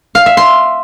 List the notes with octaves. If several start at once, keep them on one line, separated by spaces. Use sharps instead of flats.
F5
E5
C6